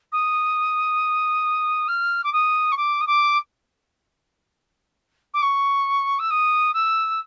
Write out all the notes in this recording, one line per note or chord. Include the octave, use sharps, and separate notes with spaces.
D#6
F6
D6
D#6
C#6
D6
D#6
D6
D6
C#6
E6
D#6
E6